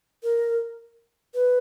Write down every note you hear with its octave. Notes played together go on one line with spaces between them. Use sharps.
A#4
B4